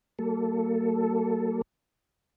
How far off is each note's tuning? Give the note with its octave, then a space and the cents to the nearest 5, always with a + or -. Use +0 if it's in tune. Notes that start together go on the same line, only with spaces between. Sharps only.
F#3 +35 A#3 -30 A4 +0